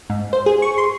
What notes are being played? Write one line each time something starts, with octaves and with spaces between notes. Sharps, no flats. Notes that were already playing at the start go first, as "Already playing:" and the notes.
G#2
C5
G#4
C#6
C6